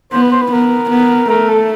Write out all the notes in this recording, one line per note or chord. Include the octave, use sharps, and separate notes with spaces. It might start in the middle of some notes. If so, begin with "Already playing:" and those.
B3 C5
B4
C5
B4
B3 A#4
B3
A3 A#4
A4